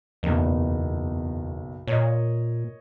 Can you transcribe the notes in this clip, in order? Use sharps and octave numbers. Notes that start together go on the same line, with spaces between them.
F#1 B1 E2
A#2 C#5 D#5